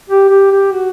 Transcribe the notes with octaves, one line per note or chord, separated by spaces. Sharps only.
G4
G4
G4
F#4